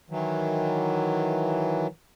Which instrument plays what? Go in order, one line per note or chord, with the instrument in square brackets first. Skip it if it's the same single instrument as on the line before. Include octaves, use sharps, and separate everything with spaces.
[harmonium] D#3 E3 F#3